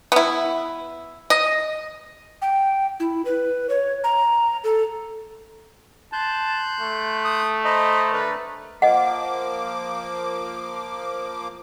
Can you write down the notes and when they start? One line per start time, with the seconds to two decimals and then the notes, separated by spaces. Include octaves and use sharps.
0.12 B3 E4
1.30 D#5
2.42 G5
3.00 E4
3.25 B4
3.69 C#5
4.04 A#5
4.64 A4
6.13 A5 C6 F#6 G6
6.80 A3
7.25 D#6
7.65 C5 D#5 A#5 B5
8.13 D3 A#4 B4 D5
8.82 F3 A#3 D#5 F#5 D6